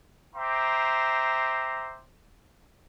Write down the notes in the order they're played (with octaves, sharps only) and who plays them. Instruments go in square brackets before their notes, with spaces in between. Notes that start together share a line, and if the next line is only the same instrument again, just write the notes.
[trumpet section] C5 E5 G5 A#5 C6 D6